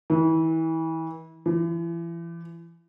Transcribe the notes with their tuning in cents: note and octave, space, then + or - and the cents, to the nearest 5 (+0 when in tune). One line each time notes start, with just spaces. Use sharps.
E3 -30
E3 +35